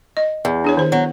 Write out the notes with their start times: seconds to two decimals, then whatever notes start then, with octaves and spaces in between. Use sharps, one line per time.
0.17 D#5
0.45 E2
0.64 D4 G#4 C#5
0.77 D#3 C5
0.92 F#3 B3